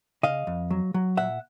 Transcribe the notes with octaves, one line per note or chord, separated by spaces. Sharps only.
C#3 D#5 F5
F2
F#3
F#3
A#2 E5 F#5